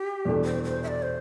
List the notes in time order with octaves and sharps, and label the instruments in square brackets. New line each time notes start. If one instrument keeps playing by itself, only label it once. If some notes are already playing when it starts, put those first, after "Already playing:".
Already playing: [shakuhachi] G4
[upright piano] E2 B2 G3 D4 A4
[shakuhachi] C5
C5
E5
D5
C5